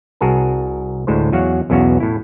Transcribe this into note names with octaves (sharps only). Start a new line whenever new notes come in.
C2 F#4 G#4 A#4 A5
D2 A2 G#3 C5
E2 F#3 F#4 C#5 F5 F#5
B1 E2 B3 C#4 F#4 F5
A2 E4